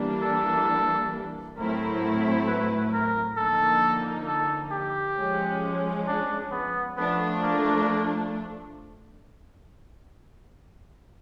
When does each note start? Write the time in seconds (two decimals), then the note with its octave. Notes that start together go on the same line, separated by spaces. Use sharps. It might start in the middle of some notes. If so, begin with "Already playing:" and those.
Already playing: E3 G3 A#3 D4
0.23 A4
1.57 A2 F#3 A3 C4 E4 A#4
2.47 B4
2.93 A#4
3.37 D3 F3 A#3 D#4 A4
4.27 A4
4.72 G4
5.17 F3 G#3 C#4
6.08 D4
6.51 B3
6.97 F3 A3 B3 D4
7.42 A#3